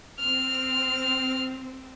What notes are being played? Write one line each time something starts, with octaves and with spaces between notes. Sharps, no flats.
C4 F6